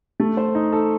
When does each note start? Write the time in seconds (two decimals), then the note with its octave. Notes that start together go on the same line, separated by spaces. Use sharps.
0.20 A3
0.37 C5
0.55 D#4
0.72 A4